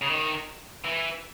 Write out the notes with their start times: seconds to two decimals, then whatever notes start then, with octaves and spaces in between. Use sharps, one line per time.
0.02 C#3
0.09 D#3
0.85 E3